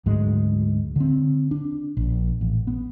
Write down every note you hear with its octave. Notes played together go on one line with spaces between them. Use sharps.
D2 G#2 F#3 G#3
D3 C4
D4
A#1
A1
B3